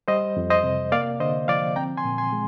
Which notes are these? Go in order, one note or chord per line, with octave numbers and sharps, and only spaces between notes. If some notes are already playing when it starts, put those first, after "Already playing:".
G3 C5 D#5
F2
C5 D#5
C3
A#3 D5 F5
D3 C5 D#5
F3 D5 F5
C4 G5 A#5
G#5 C6
A#2
G#5 C6
G#3